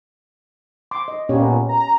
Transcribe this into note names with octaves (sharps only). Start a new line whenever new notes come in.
C6 D6
D#5
A#2 A#3 B3 C#4 G4 C#5
A#5